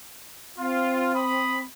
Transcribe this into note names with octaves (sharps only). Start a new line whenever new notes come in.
C4 F4
B5 D#6